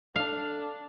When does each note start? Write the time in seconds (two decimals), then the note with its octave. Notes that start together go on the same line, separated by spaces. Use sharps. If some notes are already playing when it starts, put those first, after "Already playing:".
0.16 D4 A4 F5